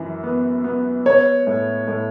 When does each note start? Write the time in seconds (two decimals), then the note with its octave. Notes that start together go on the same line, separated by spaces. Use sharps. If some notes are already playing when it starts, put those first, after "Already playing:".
Already playing: F#2 E3
0.23 B3
0.64 B3
1.05 B3 C#5
1.47 A2
1.88 A2